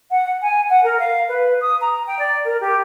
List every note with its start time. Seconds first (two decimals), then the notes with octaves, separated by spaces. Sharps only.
0.11 F#5
0.41 G#5
0.70 F#5
0.84 A#4
1.00 F5
1.29 B4
1.61 D#6
1.81 A#5
2.07 G5
2.20 D5
2.45 A#4
2.61 G4